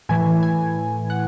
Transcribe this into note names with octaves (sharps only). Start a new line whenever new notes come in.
A2 E3 G#5
G#5
F#5